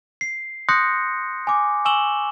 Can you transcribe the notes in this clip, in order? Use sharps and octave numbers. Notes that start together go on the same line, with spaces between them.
C7
C6 D#6 F#6 G6 A#6 C#7
G#5 D6
G#5 C#6 E6 E7 F#7 G7